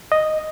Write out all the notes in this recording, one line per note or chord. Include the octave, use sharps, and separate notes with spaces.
D#5